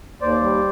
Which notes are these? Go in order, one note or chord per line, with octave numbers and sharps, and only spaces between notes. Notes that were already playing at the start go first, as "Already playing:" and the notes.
D#2 C5 D5
G3